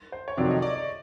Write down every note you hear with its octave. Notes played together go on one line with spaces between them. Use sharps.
C5
C#5
F2 C3 D#3 F#3 D5
D#5
D5
D5